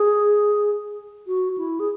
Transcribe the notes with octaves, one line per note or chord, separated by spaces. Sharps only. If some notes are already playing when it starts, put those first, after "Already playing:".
Already playing: G#4
F#4
E4
G#4